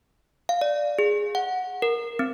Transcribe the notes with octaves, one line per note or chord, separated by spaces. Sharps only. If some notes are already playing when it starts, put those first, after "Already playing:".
F5
D5
G#4
F#5
A#4
C4